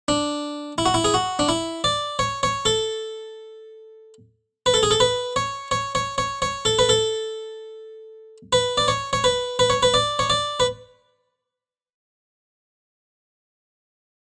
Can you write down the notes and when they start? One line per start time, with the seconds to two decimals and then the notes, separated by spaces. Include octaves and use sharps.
0.08 D4
0.78 E4
0.86 F#4
0.94 E4
1.04 G#4
1.14 F#4
1.39 D4
1.49 E4
1.84 D5
2.19 C#5
2.43 C#5
2.65 A4
4.66 B4
4.74 A4
4.83 G#4
4.91 A4
5.00 B4
5.36 C#5
5.71 C#5
5.95 C#5
6.18 C#5
6.42 C#5
6.65 A4
6.79 B4
6.89 A4
8.53 B4
8.78 D5
8.88 C#5
9.13 C#5
9.24 B4
9.59 B4
9.70 C#5
9.83 B4
9.94 D5
10.19 C#5
10.30 D5
10.60 B4